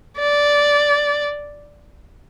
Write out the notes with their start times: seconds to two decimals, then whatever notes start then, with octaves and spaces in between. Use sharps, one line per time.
0.19 D5